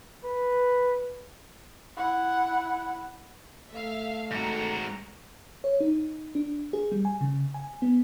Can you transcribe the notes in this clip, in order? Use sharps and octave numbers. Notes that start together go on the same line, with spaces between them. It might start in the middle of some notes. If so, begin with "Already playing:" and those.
B4
E4 F#5
A3 E5 F5
G#2 F#4 A#5
C#5
D#4
D4
G#4
G3
G#5
C#3
G#5
B3